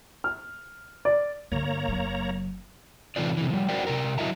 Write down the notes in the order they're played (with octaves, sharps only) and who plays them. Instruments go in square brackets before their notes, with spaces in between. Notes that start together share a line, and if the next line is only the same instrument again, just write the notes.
[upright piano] F6
D5
[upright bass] G2 D3 [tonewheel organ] A#3 C#5 A#5
[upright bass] F#1 F#3
[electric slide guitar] C3 E3 A3 D#4 F4 D5
C3 E3
F3 G3
F#4 A#4 C5 D5 G5
C3 G4 A#4
F#3 E4 D#5 E5 A5 A#5